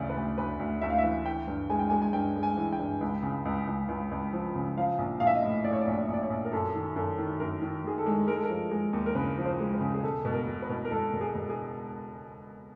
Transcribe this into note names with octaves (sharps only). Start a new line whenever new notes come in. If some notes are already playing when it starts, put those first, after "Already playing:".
Already playing: D2 C#3 E3 D5
B4
D2
D2 B4
D2
D2 E5
F5
E5
E3
E3 G5
G2
G#3 G#5
G5
G#3 G#5
G#5
G2 G5
G#3
G#5
E3
G5
G2
C#2
C#3
C#2
C#2
C#2
C#2
F3
C#3
F3 F5
A#1
A#1 F5
E5
D#5
A2
A2 D5
C#5
D5
A#1
D5
A#1
D5
C#5
A#1
A#4
F#2 A4
D#3
F#2 A4
D#3
F#2 A#4
D#3
D#3 G#4
A4
G#3
G#3 A#4
A4
A#4
F3
G#3
D#2
A#4
C#3 B4
F3
C5
G#3
B4
C#3
G#4
E1 A4
B2
A#4
E1
B4
B2
A#4
E1 A4
E1
G#4
E1
G#4